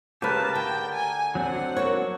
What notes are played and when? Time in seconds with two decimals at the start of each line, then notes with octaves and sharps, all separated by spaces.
0.22 C#3 G4 A#4 B4 A5
0.55 D2 G5
0.94 G#5
1.35 F#3 C4 D4 F#5
1.76 F#4 A#4 C#5